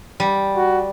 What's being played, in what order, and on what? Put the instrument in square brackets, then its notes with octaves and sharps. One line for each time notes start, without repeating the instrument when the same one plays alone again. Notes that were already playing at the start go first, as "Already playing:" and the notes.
[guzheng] G3
[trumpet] F#4